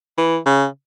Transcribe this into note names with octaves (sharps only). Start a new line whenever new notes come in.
E3
C#3